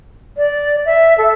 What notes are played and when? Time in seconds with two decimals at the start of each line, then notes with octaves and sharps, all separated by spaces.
0.37 D5
0.85 E5
1.18 A4